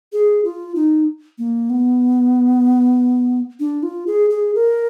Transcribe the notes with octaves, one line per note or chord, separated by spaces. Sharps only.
G#4
F4
D#4
A#3
B3
D4
F4
G#4
G#4
A#4